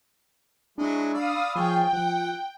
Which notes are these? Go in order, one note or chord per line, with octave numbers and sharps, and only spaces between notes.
F#3 G#3 D4 E4
D5 F5 B5 D#6 E6
F3 F4 G#4 C#5 G5
F3 F#5